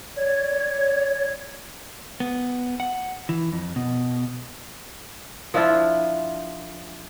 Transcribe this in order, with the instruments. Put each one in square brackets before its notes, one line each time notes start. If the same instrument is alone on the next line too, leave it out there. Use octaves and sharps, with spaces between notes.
[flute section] C#5 D5 G#6
[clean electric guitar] B3
F#5
E3
F2
B2
[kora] F3 D4 E4 F4